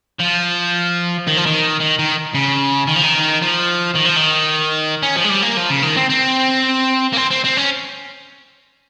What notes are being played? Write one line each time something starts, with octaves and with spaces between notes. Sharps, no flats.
F3
D#3
F3
D#3
D#3
D#3
C#3
D#3
F3
D#3
F3
D#3
F3
D#3
C#4
F3
G#3
G3
A#3
F3
C#3
D#3
C4
C4
A#3
C4
C4
C4
C#4